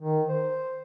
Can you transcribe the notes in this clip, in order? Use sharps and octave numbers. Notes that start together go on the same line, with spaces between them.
D#3
C5